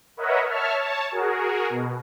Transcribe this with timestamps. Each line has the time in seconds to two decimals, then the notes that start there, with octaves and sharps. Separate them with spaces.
0.17 A#4 B4 C#5 D#5 E5 F#5
0.47 C#5 E5 A5 F6
0.79 C#5 A5
1.11 F#4 G#4 A#4
1.70 B2